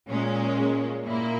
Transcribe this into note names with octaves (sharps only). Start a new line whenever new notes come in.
A#2 G#3 C#4
A#2 A#3 E4